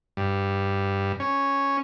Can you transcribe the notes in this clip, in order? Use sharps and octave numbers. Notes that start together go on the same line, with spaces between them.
G2
C#4